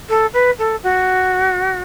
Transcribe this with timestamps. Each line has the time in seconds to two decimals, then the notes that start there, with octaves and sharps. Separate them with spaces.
0.09 A4
0.33 B4
0.58 A4
0.83 F#4